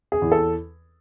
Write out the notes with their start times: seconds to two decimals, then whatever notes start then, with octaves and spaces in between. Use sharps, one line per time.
0.12 G#4
0.22 E2
0.32 A4